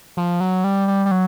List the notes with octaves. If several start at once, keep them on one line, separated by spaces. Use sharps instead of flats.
F3
F#3
G3
G3
G3
F#3